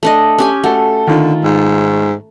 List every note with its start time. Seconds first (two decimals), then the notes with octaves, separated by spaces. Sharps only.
0.03 A3 D4 D#5
0.38 C#4 G4 G#5
0.64 A3 F#4 A4
1.07 D3 D#3 F4
1.44 G#2